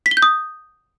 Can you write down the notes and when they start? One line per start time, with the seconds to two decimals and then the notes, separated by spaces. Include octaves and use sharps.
0.06 B6
0.11 G7
0.17 G6
0.22 D#6